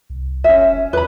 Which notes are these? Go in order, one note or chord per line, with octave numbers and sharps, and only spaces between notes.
C2
F1 C#4 E5
E2 B4 B5